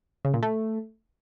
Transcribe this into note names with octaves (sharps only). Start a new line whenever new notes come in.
C#3
A#2
A3